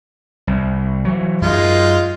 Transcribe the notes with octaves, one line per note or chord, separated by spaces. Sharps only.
C2
E3 F#3
F#2 G#3 D#4 F4